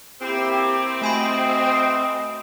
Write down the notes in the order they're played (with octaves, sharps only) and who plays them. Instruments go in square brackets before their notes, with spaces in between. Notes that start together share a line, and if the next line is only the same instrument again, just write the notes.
[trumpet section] A#3 E4 G4 [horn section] C4
[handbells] A3 G#5 B5 [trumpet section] F#4 D#5